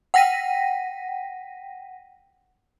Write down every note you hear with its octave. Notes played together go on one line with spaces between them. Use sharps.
F#5 G5 A#6 B6 D#7